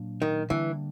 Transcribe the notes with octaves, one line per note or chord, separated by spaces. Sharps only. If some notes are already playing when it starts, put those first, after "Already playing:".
Already playing: A#2 F#3 A#3 D4
D#3
D3 E3 G3 A#3 D4